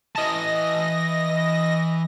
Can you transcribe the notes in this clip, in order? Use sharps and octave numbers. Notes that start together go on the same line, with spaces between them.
E3 D#5 A5 A#6